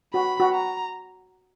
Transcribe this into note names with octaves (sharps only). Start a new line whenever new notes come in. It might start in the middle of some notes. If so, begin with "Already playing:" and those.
F#4 B5
F#4
A#5